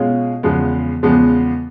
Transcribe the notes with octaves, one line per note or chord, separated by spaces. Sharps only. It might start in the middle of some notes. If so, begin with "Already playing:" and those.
Already playing: B2 G#3 C#4 F4 G#4
E2 C#3 F3 G#3 B3
E2 C#3 F3 G#3 B3